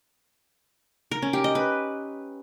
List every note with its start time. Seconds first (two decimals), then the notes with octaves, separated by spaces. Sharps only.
1.11 A#4
1.22 C#4
1.33 G4
1.44 D#5
1.55 B4